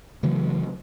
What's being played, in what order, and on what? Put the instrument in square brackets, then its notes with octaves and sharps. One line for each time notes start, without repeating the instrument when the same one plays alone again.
[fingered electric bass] C#3 E3 F#3 A3